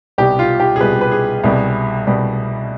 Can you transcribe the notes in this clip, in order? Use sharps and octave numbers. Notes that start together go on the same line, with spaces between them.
C2 B2 G3 G4
F4
G4
G#4
C2 B2 G3 B4
B4
G#4
C2 B2 G3
C2 B2 G3